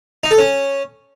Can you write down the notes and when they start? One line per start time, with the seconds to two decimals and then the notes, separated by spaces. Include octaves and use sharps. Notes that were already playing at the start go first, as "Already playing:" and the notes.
0.23 D#4
0.31 A4
0.38 C#4